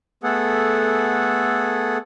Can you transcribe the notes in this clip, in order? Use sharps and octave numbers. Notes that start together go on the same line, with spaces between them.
A3 B3 G#4 A4 F#5